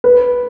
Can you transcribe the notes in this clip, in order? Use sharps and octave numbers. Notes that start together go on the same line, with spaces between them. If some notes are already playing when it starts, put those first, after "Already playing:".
B4